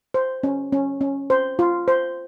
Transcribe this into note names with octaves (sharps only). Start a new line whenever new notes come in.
C5
C#4
C#4
C#4
C5
F4
C5